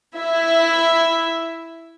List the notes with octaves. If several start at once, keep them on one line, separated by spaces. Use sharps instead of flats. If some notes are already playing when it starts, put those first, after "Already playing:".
E4 E5